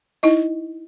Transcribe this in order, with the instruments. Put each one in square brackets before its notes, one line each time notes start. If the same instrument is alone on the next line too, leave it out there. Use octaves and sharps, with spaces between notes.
[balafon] D#4 E4 D#5